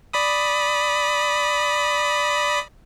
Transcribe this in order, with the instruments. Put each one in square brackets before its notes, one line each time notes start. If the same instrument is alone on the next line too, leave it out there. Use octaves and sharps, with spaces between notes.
[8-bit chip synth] D5 B5 D#6